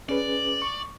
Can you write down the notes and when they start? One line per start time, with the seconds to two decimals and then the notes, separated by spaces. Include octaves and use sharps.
0.09 C#4 G#4 B4 D5
0.62 C#6